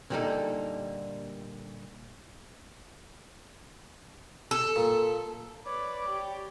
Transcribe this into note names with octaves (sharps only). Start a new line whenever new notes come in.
A#2 D3 G3 A#3 D#4 A4
A4
A#2
B4 C#5 D5 D6
G4